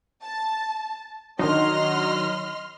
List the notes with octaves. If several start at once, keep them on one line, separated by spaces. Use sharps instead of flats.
A5
D#3 F#3 D4 D#4 D#5 C6 F6